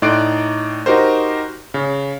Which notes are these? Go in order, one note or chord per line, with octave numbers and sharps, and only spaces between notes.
A2 D#4 D5 C6 F#6 D7
D#4 F#4 G4 A#4 C5
C#3